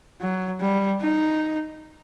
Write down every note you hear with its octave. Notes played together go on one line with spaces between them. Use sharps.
F#3
G3
D#4